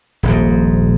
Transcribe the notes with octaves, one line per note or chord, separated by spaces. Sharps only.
D#1 A#1 G#2